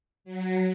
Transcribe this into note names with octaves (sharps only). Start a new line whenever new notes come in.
F#3